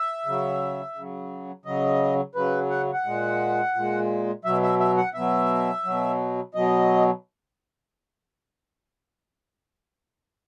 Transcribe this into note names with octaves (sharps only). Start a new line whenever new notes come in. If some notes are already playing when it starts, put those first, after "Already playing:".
Already playing: E5
C#3 F#3
C#3 F#3
C#3 F#3 D#5
C#3 F#3 B4
F#5
F#5
A#2 G#3
A#2 G#3
B2 F#3 E5
E5
E5
F#5
B2 F#3 E5
B2 F#3
B2 F#3 D#5